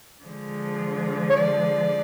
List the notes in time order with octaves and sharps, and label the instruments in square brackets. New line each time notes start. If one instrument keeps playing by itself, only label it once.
[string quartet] D3 F3 G#3
[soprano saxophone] C#5
D5